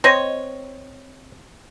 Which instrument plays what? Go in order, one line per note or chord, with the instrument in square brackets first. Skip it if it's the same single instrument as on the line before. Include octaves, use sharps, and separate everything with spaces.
[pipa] C4 C#5 [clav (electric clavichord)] D#5